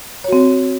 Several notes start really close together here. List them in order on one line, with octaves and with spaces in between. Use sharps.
C#5 F#4 C4